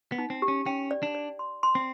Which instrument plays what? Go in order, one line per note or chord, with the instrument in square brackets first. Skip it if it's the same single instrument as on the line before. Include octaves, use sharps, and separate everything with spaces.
[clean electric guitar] B3
[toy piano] D#4
[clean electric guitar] C4
[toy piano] G4
[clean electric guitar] C#4
[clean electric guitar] C#4 [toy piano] G5
[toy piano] D5
[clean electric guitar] D4
[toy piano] D5
C6
C6
[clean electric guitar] C4